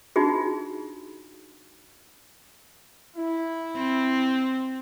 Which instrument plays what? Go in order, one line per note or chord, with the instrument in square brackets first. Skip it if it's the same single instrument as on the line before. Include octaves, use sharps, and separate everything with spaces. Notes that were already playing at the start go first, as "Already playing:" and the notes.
[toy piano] D4 D#4 F4 F#4 G#4
[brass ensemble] E4
[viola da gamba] C4